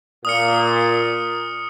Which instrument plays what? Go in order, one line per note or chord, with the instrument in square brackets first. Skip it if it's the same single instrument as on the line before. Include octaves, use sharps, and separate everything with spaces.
[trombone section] A#2 [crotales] D#6 F6 C#7